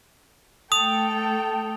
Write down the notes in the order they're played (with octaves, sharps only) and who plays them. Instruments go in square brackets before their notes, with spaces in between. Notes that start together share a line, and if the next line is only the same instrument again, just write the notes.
[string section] A3 A4 G5 [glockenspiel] D#6 F7